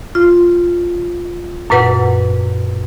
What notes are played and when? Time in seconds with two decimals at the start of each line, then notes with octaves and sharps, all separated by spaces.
0.15 F4
1.70 F#2 A#2 B4 F#5